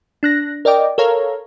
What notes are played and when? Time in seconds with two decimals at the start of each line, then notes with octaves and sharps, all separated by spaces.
0.23 D4 F#6 A#6
0.65 A#4 D5 D#5 G5 D6
0.98 A4 A#4 C#5 F5 A#5